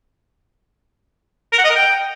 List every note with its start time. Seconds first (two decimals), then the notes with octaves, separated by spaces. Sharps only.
1.53 A#4
1.58 F#5
1.64 D#5
1.70 A#4
1.76 G5